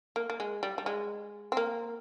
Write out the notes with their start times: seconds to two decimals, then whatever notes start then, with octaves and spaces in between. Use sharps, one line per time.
0.16 A#3
0.30 A#3
0.40 G#3
0.63 G3
0.78 G3
0.86 G#3
1.52 C4
1.57 A#3